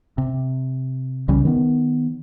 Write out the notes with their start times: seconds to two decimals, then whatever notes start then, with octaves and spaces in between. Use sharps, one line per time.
0.18 C3
1.28 C2 C#3 G3 C#4
1.45 D#3 B3